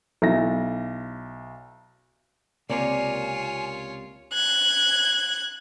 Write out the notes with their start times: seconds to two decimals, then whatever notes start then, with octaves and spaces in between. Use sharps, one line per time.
0.22 B1 E4 A#6
2.69 C#2 C3 A#3 F4 C#5 D5 G#5
4.33 F#6 G#6